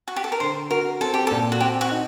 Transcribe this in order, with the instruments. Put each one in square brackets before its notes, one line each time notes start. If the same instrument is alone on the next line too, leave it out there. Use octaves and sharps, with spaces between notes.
[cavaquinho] F#4
G4
A4
A#4
[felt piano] D3 [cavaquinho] C5
[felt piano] F#4 [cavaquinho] A#4
[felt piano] C4 [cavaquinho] A4
[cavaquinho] G4
[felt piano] A#2 [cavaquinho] A4
[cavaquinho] F#4
[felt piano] C4 [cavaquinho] G4
[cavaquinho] F#4
[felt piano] D#4